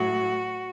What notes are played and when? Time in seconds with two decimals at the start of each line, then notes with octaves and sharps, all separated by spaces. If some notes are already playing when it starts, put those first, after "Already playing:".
Already playing: A2 F#3 F#4